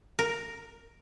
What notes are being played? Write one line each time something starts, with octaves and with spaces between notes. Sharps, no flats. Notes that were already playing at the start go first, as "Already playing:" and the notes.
A#4